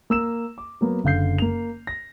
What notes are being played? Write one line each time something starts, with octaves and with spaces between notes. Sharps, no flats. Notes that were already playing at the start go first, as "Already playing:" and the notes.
A#3 E6 E7
D6
F#3 A#3 B3
F#1 D3 F5 G6 C7
A#3 F7
A#6